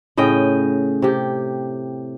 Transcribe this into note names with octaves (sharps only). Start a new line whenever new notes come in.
A2 C#3 D#5 G5
C3 G4